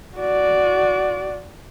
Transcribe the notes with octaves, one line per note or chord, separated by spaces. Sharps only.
F#4 D5